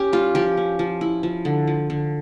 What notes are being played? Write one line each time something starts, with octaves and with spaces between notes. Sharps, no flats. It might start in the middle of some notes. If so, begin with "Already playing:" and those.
Already playing: C#4 G4
G3 F4
F3 G4
C#4
F3
E4
F3
D3
F3
D3